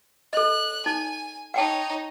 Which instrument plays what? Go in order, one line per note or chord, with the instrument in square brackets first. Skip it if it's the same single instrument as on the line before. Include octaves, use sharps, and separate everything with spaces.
[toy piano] A4 D#5 [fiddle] F#6
[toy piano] D#4 [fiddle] G#5
[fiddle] D#4 C#5 [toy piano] F#5 G5 A5